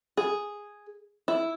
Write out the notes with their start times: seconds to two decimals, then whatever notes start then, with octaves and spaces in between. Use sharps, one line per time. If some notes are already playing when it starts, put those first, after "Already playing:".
0.17 G#4
1.28 E4